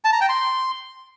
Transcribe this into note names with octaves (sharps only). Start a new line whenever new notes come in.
A5
A#5
G5
C6